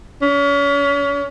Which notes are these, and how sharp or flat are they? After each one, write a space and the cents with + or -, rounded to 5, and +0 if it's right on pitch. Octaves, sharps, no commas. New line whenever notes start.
C#4 +35